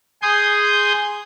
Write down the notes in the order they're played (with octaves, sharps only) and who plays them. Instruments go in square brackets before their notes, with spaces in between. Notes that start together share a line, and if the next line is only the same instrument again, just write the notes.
[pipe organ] G#4 G#5 C6 D#6 G6